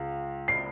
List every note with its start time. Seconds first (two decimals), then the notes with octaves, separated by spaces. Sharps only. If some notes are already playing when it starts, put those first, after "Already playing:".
Already playing: C#2
0.48 C7